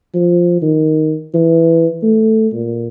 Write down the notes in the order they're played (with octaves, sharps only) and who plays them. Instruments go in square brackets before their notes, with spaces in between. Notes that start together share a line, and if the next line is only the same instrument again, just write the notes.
[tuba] F3
D#3
E3
A3
A#2